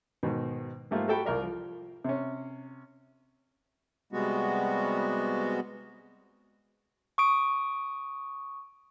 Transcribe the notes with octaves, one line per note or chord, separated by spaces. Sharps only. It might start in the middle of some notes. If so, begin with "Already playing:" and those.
G#2 B2 D#3
G#2 G3 A3 A#3 F4
F#4 G4 A4 G5 B5 E6
C2 F4 A#4 D5
F3
C3 C#4
C3 G3 G#3 B3 F#4
C#6 D#6 D7